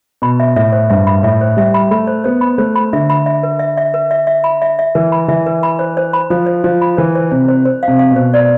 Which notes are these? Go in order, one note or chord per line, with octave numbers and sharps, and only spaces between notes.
B2 B5
E5
A2 E5
C5
G2 E5
B5
A2 E5
C5
G3 E5
B5
A3 B5
C5
B3 C5
B5
A3 C5
B5
D3 E5
B5
E5
B4
E5
E5
B4
E5
E5
B5
E5
E5
E3 B4
B5
E3 E5
B4
B5
C5
C5
B5
F3 C5
C5
F3 C5
B5
E3 C5
C5
C3 C5
C5
C5
C3 F5
F5
B2
C5
D5